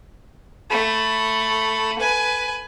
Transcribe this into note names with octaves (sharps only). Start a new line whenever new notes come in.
A3 B5
B4 G#5